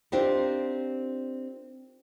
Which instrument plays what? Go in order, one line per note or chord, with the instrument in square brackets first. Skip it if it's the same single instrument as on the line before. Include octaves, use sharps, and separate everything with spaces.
[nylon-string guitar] C4 D4 D#4 F4 G4 A#4